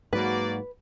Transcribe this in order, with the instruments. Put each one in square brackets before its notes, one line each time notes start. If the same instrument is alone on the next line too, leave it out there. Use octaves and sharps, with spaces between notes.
[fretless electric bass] G#2 F#3 [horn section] A#3 F#4 D5 [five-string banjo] B4